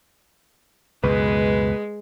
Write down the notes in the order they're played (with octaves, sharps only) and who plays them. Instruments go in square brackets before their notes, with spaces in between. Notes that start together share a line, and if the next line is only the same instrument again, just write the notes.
[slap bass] C#2 F#2 B2 [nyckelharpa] G#3 [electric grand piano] B4